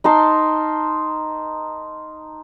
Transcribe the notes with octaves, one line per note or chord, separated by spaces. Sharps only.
D#4 A#4 A5 C6